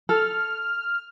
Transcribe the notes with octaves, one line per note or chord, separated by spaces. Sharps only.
A4 F6